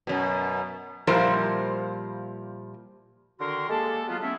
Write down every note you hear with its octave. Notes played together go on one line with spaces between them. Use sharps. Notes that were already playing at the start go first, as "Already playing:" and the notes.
F#2 B2
A#2 F3 G3 E4 A#4 C5
D3 D#3 F#4 A#4 C6
G#3 A#3 G4 A4
F#3 B3 F4
A3 B3 C#4 E4 E5